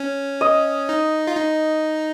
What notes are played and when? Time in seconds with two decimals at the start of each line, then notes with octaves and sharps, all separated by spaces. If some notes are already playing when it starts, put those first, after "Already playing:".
Already playing: C#4
0.41 D#5
0.89 D#4
1.27 F4
1.36 D#4